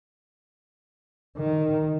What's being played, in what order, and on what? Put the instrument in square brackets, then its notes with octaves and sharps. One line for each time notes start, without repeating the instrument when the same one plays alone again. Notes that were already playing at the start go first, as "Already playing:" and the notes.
[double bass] D#3